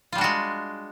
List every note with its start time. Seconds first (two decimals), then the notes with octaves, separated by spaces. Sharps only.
0.12 F4
0.15 G3
0.18 D4
0.21 F#4
0.24 G#3